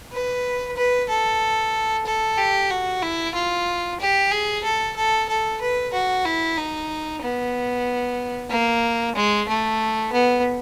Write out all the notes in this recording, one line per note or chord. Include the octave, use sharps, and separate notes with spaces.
B4
B4
A4
A4
G4
F#4
E4
F4
G4
G#4
A4
A4
A4
B4
F#4
E4
D#4
B3
A#3
G#3
A3
B3